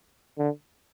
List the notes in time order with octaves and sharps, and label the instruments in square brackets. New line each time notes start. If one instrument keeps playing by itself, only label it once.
[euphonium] D3